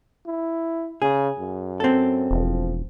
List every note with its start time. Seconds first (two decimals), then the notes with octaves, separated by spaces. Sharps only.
0.26 E4
1.02 C#3 G#4
1.39 F#2
1.80 C4 A4
2.31 E1 F3